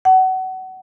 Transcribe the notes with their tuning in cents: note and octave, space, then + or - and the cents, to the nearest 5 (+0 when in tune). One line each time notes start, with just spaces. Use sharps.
F#5 +25